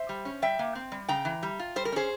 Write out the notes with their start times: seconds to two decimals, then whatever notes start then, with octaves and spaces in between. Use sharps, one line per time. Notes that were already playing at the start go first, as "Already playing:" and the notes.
Already playing: C5 E5
0.09 G3
0.25 C#4
0.42 G3 E5 G5
0.59 A#3
0.75 C4
0.92 G3
1.09 C#3 G5 A#5
1.25 E3
1.43 G3
1.59 F4
1.76 G3 C5
1.85 A#4
1.92 C#4 G#4 C5